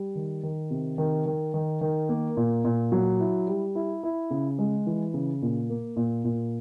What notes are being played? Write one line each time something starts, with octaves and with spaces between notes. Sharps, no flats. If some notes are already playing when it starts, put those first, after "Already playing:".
Already playing: G3
D#3
D#3
C3
D#3
D#3
D#3
D#3
A#3
A#2
A#2
F#3
E4
G3
E4
E4
C#3
G#3
E3
C#3
A#2
A#3
A#2
A#2